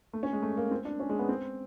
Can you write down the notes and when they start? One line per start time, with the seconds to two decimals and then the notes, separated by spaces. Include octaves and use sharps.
0.13 A3
0.23 C#4
0.33 G#3
0.42 A3
0.57 A#3
0.71 C4
0.85 D4
1.00 C#4
1.09 G#3
1.19 B3
1.29 C4